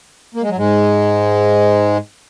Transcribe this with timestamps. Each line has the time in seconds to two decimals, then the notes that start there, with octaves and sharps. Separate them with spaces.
0.35 A#3
0.42 G#3
0.49 F#3
0.57 G#2 G#3